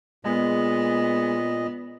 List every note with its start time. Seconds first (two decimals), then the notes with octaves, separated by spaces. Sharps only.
0.25 A#2 G#3 B3 D#5